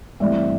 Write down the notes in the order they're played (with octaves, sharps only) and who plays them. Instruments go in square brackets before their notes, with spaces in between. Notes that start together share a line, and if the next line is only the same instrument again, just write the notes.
[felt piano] G2 E3 A3 C4 D5 E5